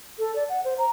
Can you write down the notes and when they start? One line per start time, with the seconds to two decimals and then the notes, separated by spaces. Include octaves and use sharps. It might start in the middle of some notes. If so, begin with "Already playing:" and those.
0.19 A4
0.36 D5
0.49 F#5
0.64 C5
0.78 A#5